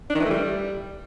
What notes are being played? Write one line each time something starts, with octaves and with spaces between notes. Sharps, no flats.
D4
D#3
E3
A3
G3